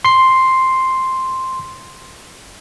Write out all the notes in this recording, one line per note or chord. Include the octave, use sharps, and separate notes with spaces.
C6 C7